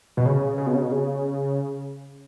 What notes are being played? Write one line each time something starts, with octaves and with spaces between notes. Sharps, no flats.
B2
C#3
C#3
B2
C#3
B2
C#3